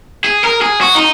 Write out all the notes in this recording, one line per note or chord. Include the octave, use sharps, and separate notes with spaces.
G#4
A#4
G#4
F#4
D#4